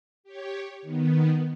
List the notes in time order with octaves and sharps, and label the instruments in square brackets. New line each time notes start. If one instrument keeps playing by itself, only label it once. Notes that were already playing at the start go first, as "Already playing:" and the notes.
[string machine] G4 C#5
D#3 B3